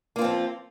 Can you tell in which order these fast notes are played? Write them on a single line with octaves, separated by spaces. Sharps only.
A#3 F4 C4 F3